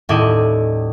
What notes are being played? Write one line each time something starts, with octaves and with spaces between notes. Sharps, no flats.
D#1 A2 E4 D5 D#5